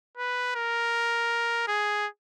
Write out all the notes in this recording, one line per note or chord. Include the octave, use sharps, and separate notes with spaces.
B4
A#4
G#4